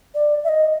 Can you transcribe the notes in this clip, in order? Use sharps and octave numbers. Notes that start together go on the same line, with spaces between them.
D5
E5
D#5